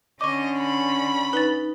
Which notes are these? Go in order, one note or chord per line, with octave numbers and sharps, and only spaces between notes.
D3 C#4 D#5 C#6 D6
B5
D#4 B4 A6